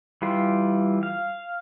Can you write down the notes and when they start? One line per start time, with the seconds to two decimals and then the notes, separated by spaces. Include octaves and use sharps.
0.22 E3 G3 F4
1.03 F5